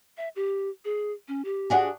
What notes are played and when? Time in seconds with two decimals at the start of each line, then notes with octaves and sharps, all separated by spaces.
0.17 E5
0.36 G4
0.85 G#4
1.28 C#4
1.45 G4
1.70 D4 F#4 G#4